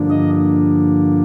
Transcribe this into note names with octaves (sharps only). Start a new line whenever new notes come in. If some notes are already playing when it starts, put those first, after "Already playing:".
Already playing: G2 D3 F3 A#3 D4
D#5